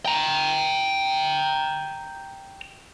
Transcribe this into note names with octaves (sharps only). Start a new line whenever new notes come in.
G5 A#5